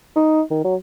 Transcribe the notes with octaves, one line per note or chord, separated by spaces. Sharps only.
D#4
D#3
F#3